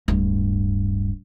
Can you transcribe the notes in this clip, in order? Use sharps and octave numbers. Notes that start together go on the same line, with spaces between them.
D1 G2